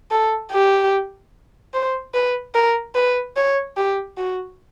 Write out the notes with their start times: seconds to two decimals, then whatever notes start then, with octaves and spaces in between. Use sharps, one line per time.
0.11 A4
0.52 G4
1.74 C5
2.14 B4
2.55 A#4
2.95 B4
3.36 C#5
3.77 G4
4.17 F#4